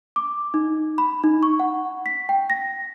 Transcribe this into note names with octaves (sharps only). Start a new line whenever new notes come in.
D6
D#4
B5
D#4
C#6
F#5
B6
G5
A#6